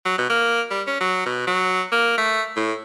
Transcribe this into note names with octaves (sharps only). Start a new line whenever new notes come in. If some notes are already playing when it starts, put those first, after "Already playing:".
F#3
B2
A#3
G3
C#4
F#3
B2
F#3
A#3
A3
A2